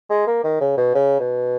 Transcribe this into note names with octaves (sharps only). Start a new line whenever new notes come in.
G#3
A#3
D#3
C#3
B2
C#3
B2